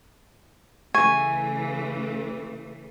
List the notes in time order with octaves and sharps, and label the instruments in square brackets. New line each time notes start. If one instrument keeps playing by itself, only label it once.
[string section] C#3 E3 A3 [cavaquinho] G#5 [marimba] C#6